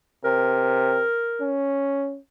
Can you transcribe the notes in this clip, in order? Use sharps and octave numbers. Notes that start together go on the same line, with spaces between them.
C3 A#4
C#4